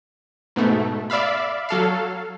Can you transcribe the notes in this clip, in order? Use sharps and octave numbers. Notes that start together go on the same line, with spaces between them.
G#2 B2 A3
D5 E5 F5 B5
F#3 A4 F5